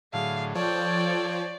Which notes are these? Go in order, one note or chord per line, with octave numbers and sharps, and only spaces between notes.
A2 D3 F#3 G#4 F5
F3 A4 C#5 D5 G5